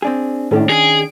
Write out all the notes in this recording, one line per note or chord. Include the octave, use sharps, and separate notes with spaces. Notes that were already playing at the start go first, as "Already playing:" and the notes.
C4 D4 G#4
A2 D#3 C#4 D4
G#4 D7